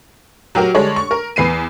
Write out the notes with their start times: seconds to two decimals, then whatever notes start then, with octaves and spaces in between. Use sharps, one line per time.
0.55 F#3 F#4 G4 A#4
0.75 D3 G3 G#3 D4 C#5
0.96 C#6
1.11 A#4
1.36 E2 B4 C7 D#7